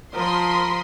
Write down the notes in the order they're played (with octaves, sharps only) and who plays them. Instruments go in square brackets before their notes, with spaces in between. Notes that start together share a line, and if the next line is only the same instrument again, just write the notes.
[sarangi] F3 [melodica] A#4 [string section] B5 C6 D#6